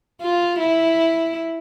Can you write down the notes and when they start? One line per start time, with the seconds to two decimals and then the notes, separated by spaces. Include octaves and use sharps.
0.21 F4
0.59 E4